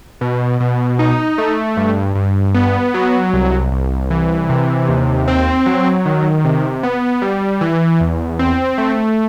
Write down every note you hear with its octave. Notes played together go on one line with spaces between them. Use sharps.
B2
B2
D#4
A3
G2
G2
B3
F#3
C2
C2
E3
C3
D#2
C4
F#3
D#3
C3
B3
G3
E3
E2
C4
A3